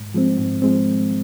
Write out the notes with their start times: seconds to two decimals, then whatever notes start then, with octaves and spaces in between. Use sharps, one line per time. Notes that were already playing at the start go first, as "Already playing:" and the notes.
Already playing: G#2
0.14 F3 G#3 C4
0.38 G#2
0.62 F3 G#3 C4